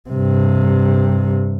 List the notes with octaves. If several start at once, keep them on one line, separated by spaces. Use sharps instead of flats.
G2 C3